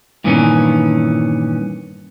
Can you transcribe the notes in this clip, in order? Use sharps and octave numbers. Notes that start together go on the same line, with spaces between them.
G2 A#2 D#3 E3 B3 C#4